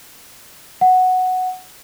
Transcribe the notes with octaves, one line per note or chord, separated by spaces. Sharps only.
F#5